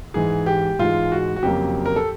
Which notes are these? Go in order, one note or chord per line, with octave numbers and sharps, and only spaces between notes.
G#2 E3 G#3 G#4
G4
G#2 E3 G#3 F4
F#4
F#4
F2 C#3 F#3 A#3 G4
A#4
A4